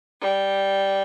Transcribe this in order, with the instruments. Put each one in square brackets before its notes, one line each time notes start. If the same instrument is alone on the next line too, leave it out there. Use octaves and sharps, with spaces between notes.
[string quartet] G3